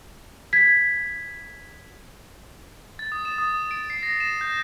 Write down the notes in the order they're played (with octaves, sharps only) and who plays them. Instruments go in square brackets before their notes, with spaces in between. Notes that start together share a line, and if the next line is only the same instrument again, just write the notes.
[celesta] G#6 B6
[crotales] A6
D#6
E7
D#6
D7
C7
A#6
E7
G6